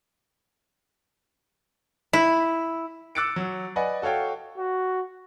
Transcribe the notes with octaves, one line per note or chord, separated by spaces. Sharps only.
E4
D6 E6 F#6 A6 C#7 D7
F#3
B4 D5 D#5 F#5 G#5
F#4 A4 C#5 F5 G5
F#4